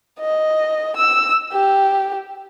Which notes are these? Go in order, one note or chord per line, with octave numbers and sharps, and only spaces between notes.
D#5
E6
G4